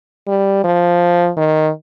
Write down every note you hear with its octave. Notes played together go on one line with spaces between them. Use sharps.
G3
F3
D#3